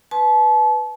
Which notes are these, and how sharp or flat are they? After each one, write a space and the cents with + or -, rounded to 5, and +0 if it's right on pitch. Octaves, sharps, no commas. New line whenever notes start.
B4 +0 A5 -35 C6 +25